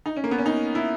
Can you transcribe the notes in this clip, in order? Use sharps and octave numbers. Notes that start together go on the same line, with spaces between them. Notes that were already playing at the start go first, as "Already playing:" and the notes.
D#4
C#4
A#3
B3
C#4
D#4
E4